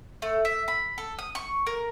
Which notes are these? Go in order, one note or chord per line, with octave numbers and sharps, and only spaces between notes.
A3
E5
B5
A4
D#6
C#6
A#4